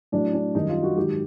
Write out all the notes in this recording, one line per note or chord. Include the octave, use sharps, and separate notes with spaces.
A2 F#3 D4
D4
F#2 D#3 G3 D#4
F4
F#4
G#2 D#3 F#3 G4